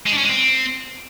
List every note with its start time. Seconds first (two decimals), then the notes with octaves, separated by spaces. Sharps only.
0.07 G#3
0.12 D4
0.18 C#4
0.23 G#3
0.29 C4